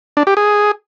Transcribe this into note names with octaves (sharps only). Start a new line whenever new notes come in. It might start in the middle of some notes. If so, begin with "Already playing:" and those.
D4
G4
G#4